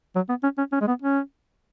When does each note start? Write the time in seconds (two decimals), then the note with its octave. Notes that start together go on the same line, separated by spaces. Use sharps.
0.15 F#3
0.29 B3
0.43 C#4
0.58 C#4
0.72 C#4
0.81 G#3
0.88 B3
1.02 C#4